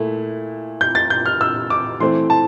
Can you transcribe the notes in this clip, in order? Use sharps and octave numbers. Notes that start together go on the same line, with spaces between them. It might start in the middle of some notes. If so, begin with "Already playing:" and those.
Already playing: A#2 A3 E4
G6
A6
G6
F6
E6
D6
E3 A3 C4 C6
A5